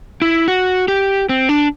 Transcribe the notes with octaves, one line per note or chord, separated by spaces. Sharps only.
E4
F#4
G4
C4
D4